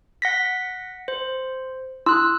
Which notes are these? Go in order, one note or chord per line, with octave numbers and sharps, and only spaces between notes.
F#5 A#6 B6
C5
E4 C6 D#6 E6 F#6